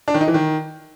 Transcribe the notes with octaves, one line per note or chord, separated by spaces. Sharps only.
D4
D#3
D#4
E3
D#3